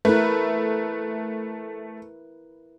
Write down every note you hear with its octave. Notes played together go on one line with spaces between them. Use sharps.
A3 E4 A#4 B4